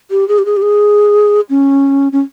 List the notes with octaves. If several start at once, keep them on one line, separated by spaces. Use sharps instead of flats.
G4
G#4
G4
G#4
G4
G#4
C#4
C#4